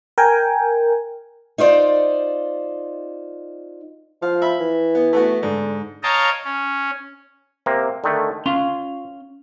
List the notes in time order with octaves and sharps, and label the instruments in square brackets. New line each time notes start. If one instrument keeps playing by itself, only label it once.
[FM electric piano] A#4 G5 G#5
[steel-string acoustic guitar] D#4 F4 C5 D5
[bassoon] F3 [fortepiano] F5
[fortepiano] E5 B5
[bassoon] E3
[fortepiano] B3
A3 B3 F#4
[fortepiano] G#2 [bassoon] D3
[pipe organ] C#5 D#5 F5 G5 A5 A#5
C#4
[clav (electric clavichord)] C3 A#3
D3 D#3 A3
[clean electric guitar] C#4 F5 C6 [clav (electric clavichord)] F4